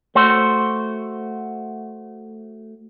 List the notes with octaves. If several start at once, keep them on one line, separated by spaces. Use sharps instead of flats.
A3 F#4 C5